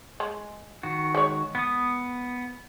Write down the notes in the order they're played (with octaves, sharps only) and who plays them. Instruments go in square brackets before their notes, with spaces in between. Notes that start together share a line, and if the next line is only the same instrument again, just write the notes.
[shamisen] G#3
[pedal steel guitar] D#3 F#4
[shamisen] G#3 C#5
[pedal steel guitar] B3 D#6